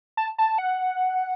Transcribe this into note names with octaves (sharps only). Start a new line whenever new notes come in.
A5
A5
F#5